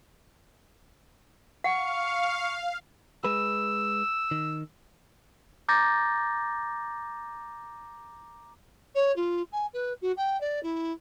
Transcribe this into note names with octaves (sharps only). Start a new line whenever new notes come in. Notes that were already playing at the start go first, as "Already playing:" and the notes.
F5 F#5 C#6
G#3 B4 E6
D#3
A#5 D6 G6 A6 A#6
C#5
F4
G#5
B4
F#4
G5
D5
E4